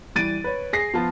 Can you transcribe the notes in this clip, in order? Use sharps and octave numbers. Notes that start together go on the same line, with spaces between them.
E3 G3 A6 D7 D#7
B4 C#5
G#4 A#6 C7
F3 B3 F4 A5